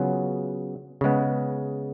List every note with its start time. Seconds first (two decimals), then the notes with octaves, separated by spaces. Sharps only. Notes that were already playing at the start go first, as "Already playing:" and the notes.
Already playing: C#3 F#3 B3 F4 G#4
1.01 C#3 G#3 B3